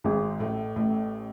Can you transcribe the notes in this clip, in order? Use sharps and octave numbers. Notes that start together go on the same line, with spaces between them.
G#1 G#2
A1 A2
A1 A2